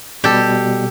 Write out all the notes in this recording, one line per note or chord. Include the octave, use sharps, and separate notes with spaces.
B2 G3 G4 A4